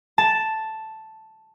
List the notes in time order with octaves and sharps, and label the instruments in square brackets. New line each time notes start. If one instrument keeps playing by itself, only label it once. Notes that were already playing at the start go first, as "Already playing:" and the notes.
[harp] A5